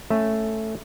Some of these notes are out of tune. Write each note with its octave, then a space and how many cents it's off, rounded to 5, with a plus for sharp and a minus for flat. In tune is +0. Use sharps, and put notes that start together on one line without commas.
A3 +0 C#4 +0